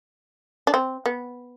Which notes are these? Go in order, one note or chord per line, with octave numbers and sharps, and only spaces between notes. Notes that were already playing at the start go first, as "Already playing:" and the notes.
D4
C4
B3